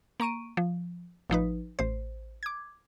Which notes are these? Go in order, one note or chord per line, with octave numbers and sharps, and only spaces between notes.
A#3 A#5 C#6 D7 D#7
F3
A1 F3 D#4 B4
A1 C5
D6 G#6